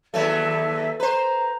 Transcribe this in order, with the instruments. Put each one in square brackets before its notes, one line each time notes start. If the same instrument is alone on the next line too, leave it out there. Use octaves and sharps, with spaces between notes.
[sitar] D#2 F#3 A3 [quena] E5
[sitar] B4 C5 [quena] A#5